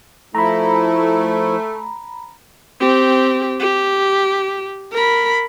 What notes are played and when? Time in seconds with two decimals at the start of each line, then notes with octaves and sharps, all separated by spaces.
0.35 F3 A3 E4 A#5 B5
2.80 C4 G4
3.60 G4
4.92 A#4 B5